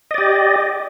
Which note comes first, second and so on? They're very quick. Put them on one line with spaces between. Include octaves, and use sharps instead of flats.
D#5 D5 G4